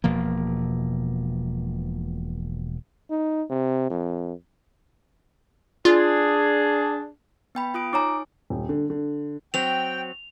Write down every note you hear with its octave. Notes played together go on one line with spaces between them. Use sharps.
E1 B2 F3 A#3
D#4
C3
F2
D4 F4 G#4
B3 G5 B5
F4 D#6 D7
D#4 C#5 G#5 A#5 D6
D#1
D3
D3
F#3 C4 G5 F7